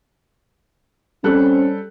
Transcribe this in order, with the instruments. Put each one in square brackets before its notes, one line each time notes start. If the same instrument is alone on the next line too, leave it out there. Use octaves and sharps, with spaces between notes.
[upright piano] G3 A4 F#6 [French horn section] C4 C#4